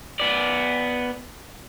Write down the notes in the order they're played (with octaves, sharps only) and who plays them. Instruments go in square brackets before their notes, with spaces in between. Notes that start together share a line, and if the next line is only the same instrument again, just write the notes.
[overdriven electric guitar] B3 D5